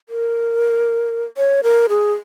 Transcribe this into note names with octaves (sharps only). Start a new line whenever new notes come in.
A#4
C#5
A#4
G#4